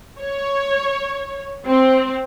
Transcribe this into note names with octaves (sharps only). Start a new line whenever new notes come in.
C#5
C4